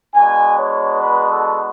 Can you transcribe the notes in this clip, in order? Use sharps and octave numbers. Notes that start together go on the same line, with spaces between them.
G#3 B3 D4 F#4 G#5
C#5
B4
A4